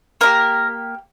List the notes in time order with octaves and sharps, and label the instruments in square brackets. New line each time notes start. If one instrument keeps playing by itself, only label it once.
[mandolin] A#3 E4 G4 A#4